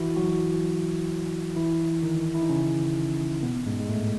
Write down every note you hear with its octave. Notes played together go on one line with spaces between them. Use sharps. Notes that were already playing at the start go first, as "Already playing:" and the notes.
Already playing: E3 E4 F#4
F#3 F#4
E3 E4
D#3 D#4
E4
D#4
C#3 C#4
B2 B3
G#2 G#3
G#3
A2 A3